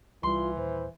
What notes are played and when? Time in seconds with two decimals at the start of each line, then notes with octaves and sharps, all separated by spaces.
0.23 C2 E3 G3 F4 C6
0.56 D#1 C5